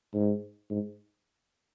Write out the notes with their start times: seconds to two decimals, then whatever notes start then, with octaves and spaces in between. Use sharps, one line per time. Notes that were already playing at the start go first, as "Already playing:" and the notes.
0.14 G#2
0.71 G#2